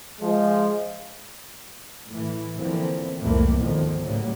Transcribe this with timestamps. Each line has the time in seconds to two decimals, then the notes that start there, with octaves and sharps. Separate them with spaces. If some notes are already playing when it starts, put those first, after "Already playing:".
0.20 F3 G#3
2.08 A2 E3
2.57 D3 E3 F3 A#3 C4
3.20 C2 F2 A2 E3 A3 A#3
3.59 G#1 D2 B2 D3 D#3 F3
4.03 A2 C#3 F#3 G3 A#3